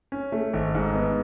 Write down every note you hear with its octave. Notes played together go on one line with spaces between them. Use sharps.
C#4
A3
G#1
G#2
B3